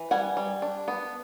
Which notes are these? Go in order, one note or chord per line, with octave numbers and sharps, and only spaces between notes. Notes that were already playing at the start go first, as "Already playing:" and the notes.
Already playing: E3
G3 F#5 G#5
G3
D4
B3